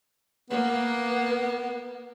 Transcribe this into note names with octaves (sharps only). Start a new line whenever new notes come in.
A#3 B3